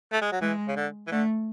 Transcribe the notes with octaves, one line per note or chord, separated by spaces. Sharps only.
A3
G#3
F#3
E3 G#3
C#3
D3
E3
D3 A3